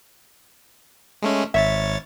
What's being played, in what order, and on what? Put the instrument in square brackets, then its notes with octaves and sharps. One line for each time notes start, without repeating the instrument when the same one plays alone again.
[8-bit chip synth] G#3 A3 C#4
[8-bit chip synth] G#1 C#5 A6 [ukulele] E5